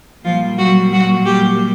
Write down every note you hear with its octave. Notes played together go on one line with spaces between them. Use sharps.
A#2 F3 G3 A#3 F4
F#3 F#4
F#3 F#4
G3 G4